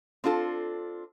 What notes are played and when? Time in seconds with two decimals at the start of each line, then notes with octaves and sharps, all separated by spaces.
0.24 C4 D4 F4 A4